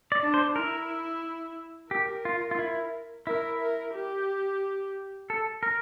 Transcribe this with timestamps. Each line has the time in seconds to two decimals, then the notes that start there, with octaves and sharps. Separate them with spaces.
0.12 D5
0.22 D4
0.34 C5
0.56 E4 A#4
1.91 G4 A#4
2.25 F4
2.51 F4
2.59 E4
3.27 E4 A#4
3.61 A#4
3.94 G4
5.30 A4
5.63 A#4